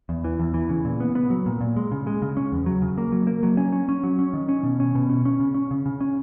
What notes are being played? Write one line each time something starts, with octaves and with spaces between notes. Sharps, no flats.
E2
E3
E2
E3
C#3
A#2
B3
B3
F#3
A#2
A#2
G#3
C#3
G#3
C#3
C#4
E2
F#3
C#3
A#3
F#3
A#3
F#3
C#4
C#4
C#4
F#3
C#4
D#3
C#4
B2
C#4
B2
C#4
C#4
C#3
C#4
C#3
C#3
C#4